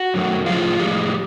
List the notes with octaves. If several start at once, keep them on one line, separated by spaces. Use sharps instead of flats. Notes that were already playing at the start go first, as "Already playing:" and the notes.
Already playing: F#4
F#2 D#3 F#3 A3
A2 F3 G#3 F4
A2 F3 G#3 G4